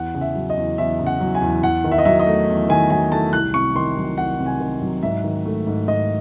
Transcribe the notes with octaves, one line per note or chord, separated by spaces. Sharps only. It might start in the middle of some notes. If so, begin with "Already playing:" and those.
Already playing: E2 F#5
C#3
E5
F#3
D#5
E2
E2 E5
C#3
F#5
F#3
G#5
E2
E2 F#5
D#3
E5
D#5
F#3 E5
D#5
A3
E2
D#3 G#5
F#3 G#5
A3 A5
C2 F#6
C3 C#6
D#3 C6
F#3
C2 F#5
C3
G#5
D#3
F#3
G#2 E5
D#3
A3
G#2
G#2 D#5